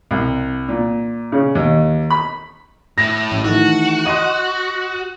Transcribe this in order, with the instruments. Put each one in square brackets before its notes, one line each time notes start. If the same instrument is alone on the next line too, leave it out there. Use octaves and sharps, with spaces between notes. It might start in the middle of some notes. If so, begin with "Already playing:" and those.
[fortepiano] C2
A#2
C#3
D#2
B5
[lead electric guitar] A2 E4 [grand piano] A#6
[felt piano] A1
[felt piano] D#3 E3 A3 [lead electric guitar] F#4
[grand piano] D#5 D#7 [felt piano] C6 D#6